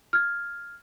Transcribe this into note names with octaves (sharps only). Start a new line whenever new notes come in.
F6 G#6